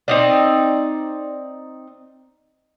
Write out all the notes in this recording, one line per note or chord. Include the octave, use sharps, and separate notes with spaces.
C4 D#4 D5